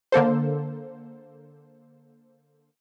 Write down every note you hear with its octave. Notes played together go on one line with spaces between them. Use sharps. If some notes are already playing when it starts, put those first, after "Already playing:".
D3 A#3 A4 C5